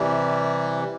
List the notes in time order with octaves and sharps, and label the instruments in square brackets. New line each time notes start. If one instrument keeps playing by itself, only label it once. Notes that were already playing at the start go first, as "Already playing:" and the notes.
Already playing: [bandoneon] C3 E3 G3